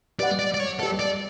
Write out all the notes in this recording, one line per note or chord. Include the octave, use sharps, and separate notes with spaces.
G4 B4 D5 D#5 F#5
D5
D5
C#5
G4 A4 B4 D#5 F#5
D5